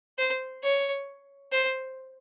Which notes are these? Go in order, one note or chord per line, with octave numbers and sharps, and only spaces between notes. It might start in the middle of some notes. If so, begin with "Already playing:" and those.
C5
C#5
C5